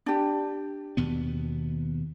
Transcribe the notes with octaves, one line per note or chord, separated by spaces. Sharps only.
D4 G4
D#2 B2 B3